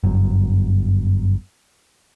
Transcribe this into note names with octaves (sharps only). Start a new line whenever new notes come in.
G1 F#2